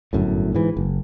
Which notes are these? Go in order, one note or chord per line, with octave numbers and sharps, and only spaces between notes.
G1 F#2 A2
G#2 E3
F#1